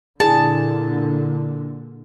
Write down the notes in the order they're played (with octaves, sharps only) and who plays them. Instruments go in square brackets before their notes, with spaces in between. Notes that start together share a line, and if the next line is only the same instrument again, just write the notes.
[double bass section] A#2 D3 [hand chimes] E4 D5 [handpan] G#4 [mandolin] A5